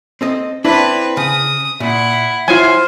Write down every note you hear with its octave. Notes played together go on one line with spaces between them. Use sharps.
C4 A4 D#5
C4 D4 E4 B4
C#3 D#6
A#2 E4 F#5
F#3 E4 F4 C5 G#5